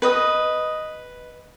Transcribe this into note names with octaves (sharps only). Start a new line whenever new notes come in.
B4 D#5 D#6